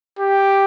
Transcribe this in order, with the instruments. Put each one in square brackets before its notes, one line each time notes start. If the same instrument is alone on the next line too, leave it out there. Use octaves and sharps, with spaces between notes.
[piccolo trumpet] G4